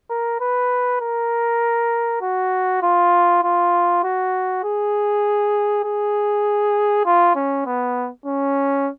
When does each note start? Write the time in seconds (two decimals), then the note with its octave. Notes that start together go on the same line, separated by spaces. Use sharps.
0.10 A#4
0.40 B4
1.01 A#4
2.21 F#4
2.83 F4
3.43 F4
4.04 F#4
4.64 G#4
5.85 G#4
7.05 F4
7.35 C#4
7.66 B3
8.26 C#4